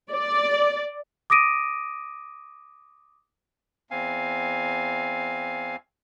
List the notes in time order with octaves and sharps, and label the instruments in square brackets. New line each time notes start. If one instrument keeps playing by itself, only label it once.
[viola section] D5
[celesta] D6 D#6 A#6 D7 D#7
[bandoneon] E2 C4 F5 G#5